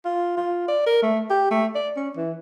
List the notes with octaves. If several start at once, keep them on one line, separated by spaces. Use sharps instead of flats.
F4
F4
D5
A#4
A3
G4
A3
D5
C#4
E3